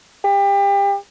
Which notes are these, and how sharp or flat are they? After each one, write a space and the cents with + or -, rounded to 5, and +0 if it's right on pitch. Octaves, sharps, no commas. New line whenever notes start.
G4 +30